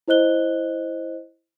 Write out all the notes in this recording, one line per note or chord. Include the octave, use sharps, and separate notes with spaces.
E4 C5 D#5 F#6 G7